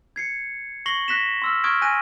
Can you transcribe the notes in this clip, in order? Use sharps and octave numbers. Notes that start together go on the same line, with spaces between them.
G#6 C7 C#7
C#6 A#6 C7 F#7 G7
F#6 A#6 B6 E7
C6 E6 F6
C#6 D#6 F6 G6 G#6 D7
G#5 F#6 A#6 D#7